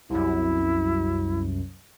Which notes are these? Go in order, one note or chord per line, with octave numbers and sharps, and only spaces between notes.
C2 F#2 E4